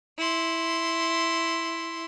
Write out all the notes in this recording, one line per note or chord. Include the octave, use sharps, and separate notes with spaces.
E4 C6